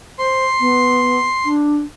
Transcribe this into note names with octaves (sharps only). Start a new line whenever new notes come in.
C5 C6
B3
D4